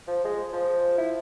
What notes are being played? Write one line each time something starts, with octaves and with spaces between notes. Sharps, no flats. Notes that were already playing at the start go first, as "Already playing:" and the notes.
F3
G#3
F3
E4